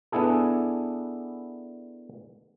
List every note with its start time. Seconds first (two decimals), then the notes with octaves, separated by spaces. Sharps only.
0.12 B3 D4 E4 G#4 A4